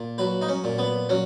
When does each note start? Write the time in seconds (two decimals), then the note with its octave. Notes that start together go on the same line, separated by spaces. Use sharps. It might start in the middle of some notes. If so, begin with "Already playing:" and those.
Already playing: A#2
0.18 F#3 B4
0.41 D#4
0.49 C#4
0.64 A#2
0.78 B3
1.09 F#3 C#4